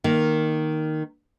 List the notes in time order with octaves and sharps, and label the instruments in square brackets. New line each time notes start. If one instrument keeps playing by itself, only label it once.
[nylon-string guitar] D#3 A#3